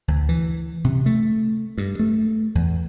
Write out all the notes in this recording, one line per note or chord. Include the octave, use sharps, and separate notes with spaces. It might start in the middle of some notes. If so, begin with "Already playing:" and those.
D2
E3
C3
A3
G2
A3
E2